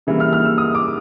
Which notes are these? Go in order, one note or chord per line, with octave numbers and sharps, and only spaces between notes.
C#3 E3 G3 A#3
F6
F6
E6
D#6
D6